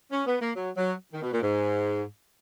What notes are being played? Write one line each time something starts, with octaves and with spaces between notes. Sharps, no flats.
C#4
B3
A#3
F#3
F#3
D#3
B2
A#2
G#2